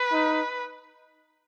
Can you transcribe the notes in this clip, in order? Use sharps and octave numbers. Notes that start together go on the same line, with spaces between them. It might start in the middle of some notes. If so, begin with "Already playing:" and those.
Already playing: B4
D#4